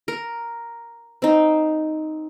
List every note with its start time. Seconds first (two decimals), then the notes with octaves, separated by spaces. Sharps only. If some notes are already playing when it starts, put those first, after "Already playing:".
0.08 A#4
1.22 C4 D#4